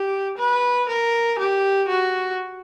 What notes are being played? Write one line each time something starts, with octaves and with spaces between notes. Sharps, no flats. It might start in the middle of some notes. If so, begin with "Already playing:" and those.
Already playing: G4
B4
A#4
G4
F#4